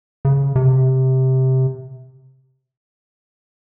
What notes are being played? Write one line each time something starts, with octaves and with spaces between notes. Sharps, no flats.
C#3
C3